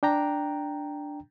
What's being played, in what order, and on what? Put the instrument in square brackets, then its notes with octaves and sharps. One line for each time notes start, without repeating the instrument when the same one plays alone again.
[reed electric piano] D4 G5 A#5